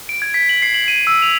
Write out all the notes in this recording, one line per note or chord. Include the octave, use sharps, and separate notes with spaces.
D7
G#6
B6
F#7
C7
F#7
D#7
E6
F7